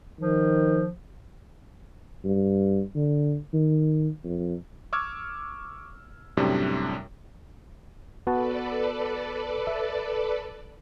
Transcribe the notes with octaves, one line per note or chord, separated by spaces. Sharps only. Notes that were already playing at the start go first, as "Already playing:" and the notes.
D#3 F3
G2
D3
D#3
F2
C#6 D6 E6 F6 G#6
F#2 A2 C3 G3 D4
B3 F#4 A4 B4 D5 A5
E5